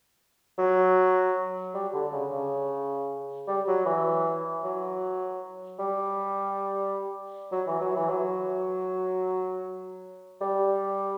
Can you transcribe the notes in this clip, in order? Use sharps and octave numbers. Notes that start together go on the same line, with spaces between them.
F#3
G3
D3
C#3
C#3
G3
F#3
E3
F#3
G3
F#3
E3
F#3
E3
F#3
G3